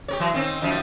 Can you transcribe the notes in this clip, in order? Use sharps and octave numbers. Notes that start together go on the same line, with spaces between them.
G4 A#4 C#5
E3 F#3
D#3 C4 C#4
F#2 D#3 F3